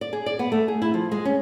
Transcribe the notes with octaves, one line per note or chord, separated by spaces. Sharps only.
D5
G#4
D5
B3
A3
G#4
E4
F3
G#3
C#4